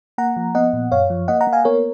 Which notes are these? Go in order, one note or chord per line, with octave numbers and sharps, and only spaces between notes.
A#3 F#5 A#5
F3
B3 D#5 F#5
A#2
F#2 C#5 F5
F3
A#3 D#5 F#5
F#5 A#5
A#3
F5 G#5
B3 A#4 C#5